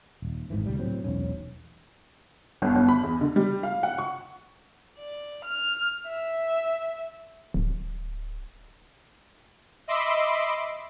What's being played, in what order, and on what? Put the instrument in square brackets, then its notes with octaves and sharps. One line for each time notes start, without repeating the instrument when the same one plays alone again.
[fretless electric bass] D#1
G#1 G#2 E3
C#2 A#2 G3
A2 F#3 C4
E1 B1 C#4
[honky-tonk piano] G1
G1
B5
E2
D3
G3
F5
F#5
C#6
[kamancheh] D5
F6
E5
[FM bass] D1
[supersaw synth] D#5 E5 B5 C6 D6 E6